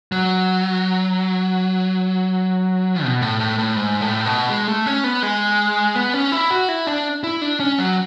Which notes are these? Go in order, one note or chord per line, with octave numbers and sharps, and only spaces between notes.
F#3
B2
A2
A2
A2
G#2
A2
B2
G#3
A3
C#4
B3
G#3
B3
C#4
E4
F#4
E4
D4
E4
D4
C#4
F#3